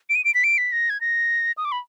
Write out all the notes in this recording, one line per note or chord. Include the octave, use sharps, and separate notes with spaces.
D7
D#7
D7
B6
D7
B6
A#6
G#6
A#6
D#6
D6
B5